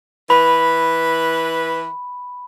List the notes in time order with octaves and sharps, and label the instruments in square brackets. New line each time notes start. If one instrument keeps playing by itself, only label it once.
[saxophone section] E3 B4 [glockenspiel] B5